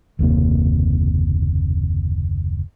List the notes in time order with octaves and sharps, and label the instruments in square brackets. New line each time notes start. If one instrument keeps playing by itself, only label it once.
[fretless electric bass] F#1 D#2 C3 A#3